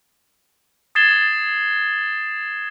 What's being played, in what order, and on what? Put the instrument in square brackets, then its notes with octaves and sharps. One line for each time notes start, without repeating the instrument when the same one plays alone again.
[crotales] D#6 G#6 A6 C7 E7 G7